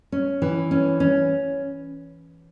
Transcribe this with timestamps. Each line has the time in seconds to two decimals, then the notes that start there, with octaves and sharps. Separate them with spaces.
0.12 C#4
0.42 E3
0.71 C#4
1.00 C#4